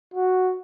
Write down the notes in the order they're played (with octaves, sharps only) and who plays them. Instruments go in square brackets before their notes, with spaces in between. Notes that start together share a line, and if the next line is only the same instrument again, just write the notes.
[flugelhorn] F#4